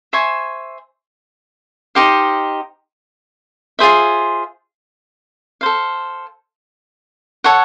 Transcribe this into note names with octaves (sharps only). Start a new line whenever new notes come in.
C5 E5 G#5 C#6
D#4 G4 C5 F5
F4 G#4 C5 E5
A4 C5 F5
A4 C#5 F#5